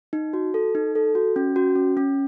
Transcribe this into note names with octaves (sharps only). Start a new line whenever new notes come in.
D#4
F#4
A4
D#4
A4
F#4
C#4
F#4
C#4
C#4